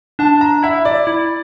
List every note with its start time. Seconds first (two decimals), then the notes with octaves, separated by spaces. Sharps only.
0.19 D4 A5
0.41 A#5
0.63 E4 E5
0.85 D5
1.07 E4